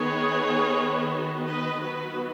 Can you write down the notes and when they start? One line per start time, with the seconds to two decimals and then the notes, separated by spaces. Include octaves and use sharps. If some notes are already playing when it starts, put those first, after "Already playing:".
Already playing: D#3 B3 G#4 C#5
1.14 F#4
1.47 B4 D#5
1.80 D#3 F#3 B3 F#4 B4